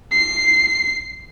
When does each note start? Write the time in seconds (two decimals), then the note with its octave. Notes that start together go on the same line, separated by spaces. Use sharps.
0.11 C7